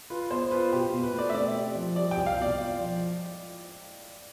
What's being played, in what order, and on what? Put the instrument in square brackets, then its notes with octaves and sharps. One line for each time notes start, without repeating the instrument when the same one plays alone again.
[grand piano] F4 [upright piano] B4
[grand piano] B3 [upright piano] C5
[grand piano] F4 [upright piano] B4
[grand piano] B2 [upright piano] G4
[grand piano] B2
[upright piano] B4
[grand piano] A3 [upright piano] D5
[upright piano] E5
[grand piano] C4 [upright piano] D5
[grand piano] G4
F3
[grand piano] G3 [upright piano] D5
[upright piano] G5
[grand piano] C2
[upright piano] F5
[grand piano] B2 [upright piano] D5
[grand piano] F4
F3